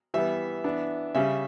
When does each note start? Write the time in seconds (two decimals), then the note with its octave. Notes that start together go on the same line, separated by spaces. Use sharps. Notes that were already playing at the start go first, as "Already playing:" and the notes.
0.14 E3 G3 B3 E5
0.64 E3 B3 D4
1.15 C#3 G3 C#4 E5